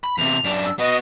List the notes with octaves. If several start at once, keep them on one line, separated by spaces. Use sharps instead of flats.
B5
E2 C3 F7
F#2 D4
E6
B3 F#4 D#5